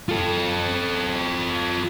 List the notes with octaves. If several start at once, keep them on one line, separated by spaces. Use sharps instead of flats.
F4 A4